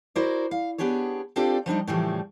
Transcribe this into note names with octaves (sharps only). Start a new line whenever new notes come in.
E4 F#4 A#4 C5 D5
F5
B3 D4 G4 G#4 C#5
C4 D4 F4 G4 A4 D5
F3 G3 D4 D#4
A2 C#3 E3 F3 G3 A3